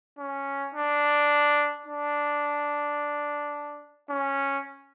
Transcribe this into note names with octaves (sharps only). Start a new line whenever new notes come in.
C#4
D4
D4
C#4